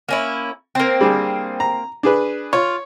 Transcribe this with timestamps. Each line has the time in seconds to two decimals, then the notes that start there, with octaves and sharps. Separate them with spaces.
0.09 A#3 C#4 E4
0.75 A#3 C4
1.01 G3 D4 G#4
1.60 A#5
2.03 D4 G#4 B4
2.53 F4 C#5